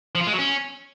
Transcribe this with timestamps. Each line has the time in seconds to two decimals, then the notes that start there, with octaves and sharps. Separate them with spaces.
0.15 F3
0.21 F4
0.27 G#3
0.33 F#3
0.39 C#4